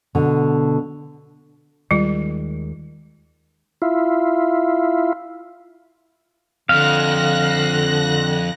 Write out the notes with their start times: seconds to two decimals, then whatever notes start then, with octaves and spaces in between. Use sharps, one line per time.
0.15 B2 D3
1.91 D#2 D#3 G3 G#3 F4
3.82 E4 F4
6.69 F2 D3 F5 F#6 A#6